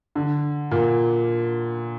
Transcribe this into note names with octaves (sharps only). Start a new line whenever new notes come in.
D3
A#2